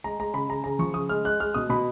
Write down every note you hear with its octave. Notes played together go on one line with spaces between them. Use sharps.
G#3 A#5
G#3 A#5
C#3 B5
C#3 A#5
C#3 A#5
F3 C#6
C#3 D#6
G#3 F6
G#3 F#6
G#3 F6
B2 D#6
B2 B5